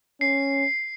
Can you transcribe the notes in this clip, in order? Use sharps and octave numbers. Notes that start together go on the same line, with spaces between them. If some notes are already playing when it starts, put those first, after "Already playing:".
C#4 C7